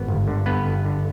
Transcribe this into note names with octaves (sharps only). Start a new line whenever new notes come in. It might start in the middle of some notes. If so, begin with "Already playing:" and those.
Already playing: G#1 B3 B4
G1
D3
G2 B3 B4
G1
D3